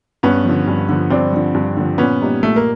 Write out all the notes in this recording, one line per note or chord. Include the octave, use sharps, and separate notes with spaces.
G2 B3 C#4
D3 F3
G2
D3 F3
G2 C4 D4
D3 F3
G2
D3 F3
A#2 B3 C#4
G3 A#3 D#4 G4
A#2 A3
A#3